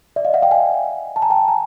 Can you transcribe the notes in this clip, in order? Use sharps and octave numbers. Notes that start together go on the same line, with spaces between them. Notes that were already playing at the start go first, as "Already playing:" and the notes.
D5 E5
D#5 F5
E5 F#5
F5 G5
F#5 G#5
A5
G#5 A#5
G5 A5
G#5 A#5